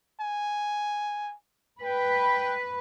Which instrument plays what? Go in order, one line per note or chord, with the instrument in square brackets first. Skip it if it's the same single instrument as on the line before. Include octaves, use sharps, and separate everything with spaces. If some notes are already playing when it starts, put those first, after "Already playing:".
[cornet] G#5
[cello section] B4 [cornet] G5